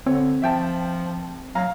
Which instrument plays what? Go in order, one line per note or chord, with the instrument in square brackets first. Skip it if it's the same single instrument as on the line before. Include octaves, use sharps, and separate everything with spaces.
[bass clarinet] D3 [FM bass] C4 [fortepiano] C#5
[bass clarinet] F3 [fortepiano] E5 G5 A5
[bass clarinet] F#3 [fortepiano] F5 A#5